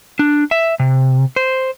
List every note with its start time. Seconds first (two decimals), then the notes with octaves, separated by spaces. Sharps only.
0.19 D4
0.51 E5
0.80 C3
1.36 C5